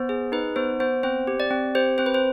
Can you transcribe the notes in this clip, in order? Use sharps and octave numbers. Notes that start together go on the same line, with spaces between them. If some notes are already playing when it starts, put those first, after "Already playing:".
Already playing: B3 C5
G#4
D#4 B4
B3 C5
B3 C5
C4 C5
G4
D5
C4
G4 C5
C4 C5
B4
C5